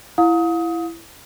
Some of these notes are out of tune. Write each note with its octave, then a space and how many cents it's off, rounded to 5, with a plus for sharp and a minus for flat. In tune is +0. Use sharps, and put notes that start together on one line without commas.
E4 +15 F5 +40 D#6 +25